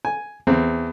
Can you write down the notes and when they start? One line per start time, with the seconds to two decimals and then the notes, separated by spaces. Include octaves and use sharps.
0.05 G#5
0.47 E2 C4